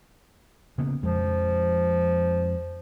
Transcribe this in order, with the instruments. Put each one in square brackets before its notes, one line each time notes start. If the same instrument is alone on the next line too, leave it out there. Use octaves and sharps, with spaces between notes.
[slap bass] C#3 A#3 B3
[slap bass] F2 G#3 [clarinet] F3